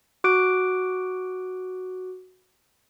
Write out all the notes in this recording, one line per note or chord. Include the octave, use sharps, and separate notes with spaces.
F#4 D6 F#6 D7